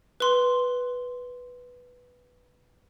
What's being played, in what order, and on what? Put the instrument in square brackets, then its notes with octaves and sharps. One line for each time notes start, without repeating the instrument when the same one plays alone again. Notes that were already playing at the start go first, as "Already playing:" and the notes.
[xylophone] B4 C6